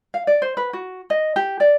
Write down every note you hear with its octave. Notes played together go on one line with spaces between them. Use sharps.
F5
D5
C5
B4
F#4
D#5
G4
D5